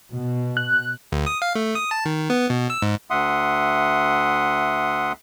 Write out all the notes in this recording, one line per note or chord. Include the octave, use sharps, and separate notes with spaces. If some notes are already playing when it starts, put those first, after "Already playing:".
B2
F#6
D2
D#6
F5
A3
D#6
A5
D#3
B3
B2
E6
G#2
D2 E5 F#5 C6 D#6